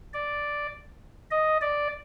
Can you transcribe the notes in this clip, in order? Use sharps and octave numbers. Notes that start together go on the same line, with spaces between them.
D5
D#5
D5